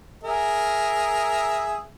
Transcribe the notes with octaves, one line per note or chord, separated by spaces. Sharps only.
G#4 A#4 E5